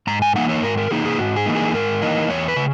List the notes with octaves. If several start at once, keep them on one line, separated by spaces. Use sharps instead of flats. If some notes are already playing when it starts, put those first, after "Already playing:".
G#2 A#5
G#5
E3 A#3 D#4 F#5
C#5
G#2 A#4
A#4
E3 A#3 D#4 G#4
G#4
G#2 F#4
G#4
E3 A#3 D#4
G#4
G#2 A#4
E3 A#3 D#4
E2 C#5
B4
C#3